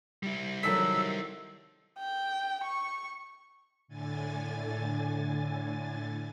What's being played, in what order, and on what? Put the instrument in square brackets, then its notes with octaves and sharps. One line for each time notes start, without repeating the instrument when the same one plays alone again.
[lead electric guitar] G3 E4
[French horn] D#3 [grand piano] F#3 A4 B6 [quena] E6
[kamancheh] G5
C#6
[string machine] A2 D3 G#5 A6